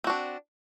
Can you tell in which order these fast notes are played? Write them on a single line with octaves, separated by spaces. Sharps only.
C4 F#4 D4